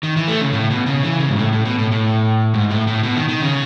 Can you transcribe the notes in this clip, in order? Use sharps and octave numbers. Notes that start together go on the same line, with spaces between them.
D#3
E3
A3
C#3
A2
B2
C#3
E3
C#3
G#2
A2
A2
B2
A2
A2
G#2
A2
A2
B2
D#3
D#3
C#3